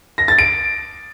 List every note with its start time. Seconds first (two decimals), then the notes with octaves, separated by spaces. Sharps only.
0.18 A#6
0.28 A6
0.39 D7